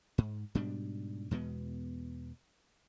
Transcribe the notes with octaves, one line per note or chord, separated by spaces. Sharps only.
G#2
G#2 B2 G3 D4
E2 B2 G#3 B3